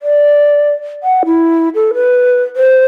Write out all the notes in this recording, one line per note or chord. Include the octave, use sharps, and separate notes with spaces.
D5
F#5
E4
A4
B4
C5